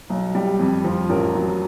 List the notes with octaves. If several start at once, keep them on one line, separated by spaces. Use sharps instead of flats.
B1
G3
F2
F3
A1 A#4
F#3